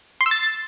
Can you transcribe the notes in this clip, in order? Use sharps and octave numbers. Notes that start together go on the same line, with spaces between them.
C6
E6
A6